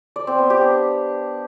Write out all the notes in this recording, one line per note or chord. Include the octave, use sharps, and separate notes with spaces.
D5
C4
B3
G4
D4